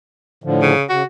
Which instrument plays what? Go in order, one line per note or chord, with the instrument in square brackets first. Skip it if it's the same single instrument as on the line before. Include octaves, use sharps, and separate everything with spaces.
[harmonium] A2 D3 F3
[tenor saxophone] C#3
[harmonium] C#3 [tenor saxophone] F#4